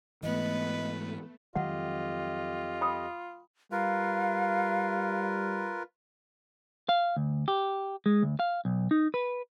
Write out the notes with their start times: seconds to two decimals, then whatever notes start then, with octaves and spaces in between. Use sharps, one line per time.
0.23 G#2 E3 A3 B3 B4 D#5
1.56 F2 D#3 F#3 G#3 F4 G4 D#5 F#5
2.81 G5 B5 D#6
3.72 G3 F4 A#4 B4 F5
6.89 F5
7.17 D2
7.48 G4
8.06 G#3
8.23 D2
8.40 F5
8.65 B1
8.91 D#4
9.14 B4